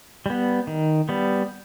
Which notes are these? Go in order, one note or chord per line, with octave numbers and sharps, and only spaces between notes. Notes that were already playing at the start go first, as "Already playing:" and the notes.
G3 B3
D#3
G3 B3